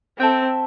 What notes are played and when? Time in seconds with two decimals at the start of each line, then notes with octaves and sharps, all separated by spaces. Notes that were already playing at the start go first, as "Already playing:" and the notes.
0.19 C4 A4 E5 G5